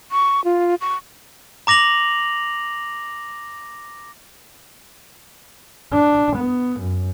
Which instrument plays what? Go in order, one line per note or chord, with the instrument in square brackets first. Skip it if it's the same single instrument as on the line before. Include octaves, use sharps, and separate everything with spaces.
[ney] C#6
F4
C#6
[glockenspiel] A#5 D6 A#6 F7 F#7
[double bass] D4
B3
F#2